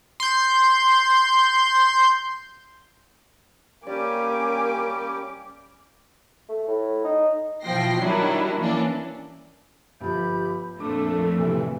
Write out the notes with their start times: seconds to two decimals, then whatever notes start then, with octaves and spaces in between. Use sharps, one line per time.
0.20 C6 G6
3.87 G3 A#3 C#4 G4 D5 G#5 D6
6.49 A3
6.68 A2
7.05 D#4
7.63 B2 E3 F3 G5 A#6 C7
8.01 D#3 F#3 G3 D4 E4
8.60 E3 A#3 C#4 D4
10.01 G1 F3 G4 B5 G6
10.80 F2 A#2 A3 D4 A4 D6
11.38 D1 D2 A2 C3 E3